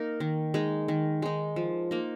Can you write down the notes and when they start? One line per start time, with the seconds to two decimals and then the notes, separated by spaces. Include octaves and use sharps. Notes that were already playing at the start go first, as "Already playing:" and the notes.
Already playing: A#3 D#4 A#4
0.20 D#3
0.54 G#3 D#4
0.88 D#3
1.22 G#3 D#4
1.56 F3
1.91 A#3 D#4